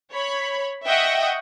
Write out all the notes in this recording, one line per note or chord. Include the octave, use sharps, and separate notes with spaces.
C#5 B5
D#5 E5 F#5 G5 C#6 D#6